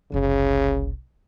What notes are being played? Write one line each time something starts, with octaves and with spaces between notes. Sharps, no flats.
F#1 C2 C#3